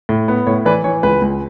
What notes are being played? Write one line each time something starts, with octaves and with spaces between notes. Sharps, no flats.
A2
B3
A2 C#5
E3 B4 D5
E3 C#5
C#2 B4
C#2